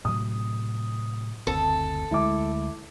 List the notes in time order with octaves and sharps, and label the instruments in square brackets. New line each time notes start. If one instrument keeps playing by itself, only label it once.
[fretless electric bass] A2 C3 F#3 [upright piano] D#6
[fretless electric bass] F#1 D2 C4 [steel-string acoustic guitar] A4
[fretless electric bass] D2 G#3 [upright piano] E4 D6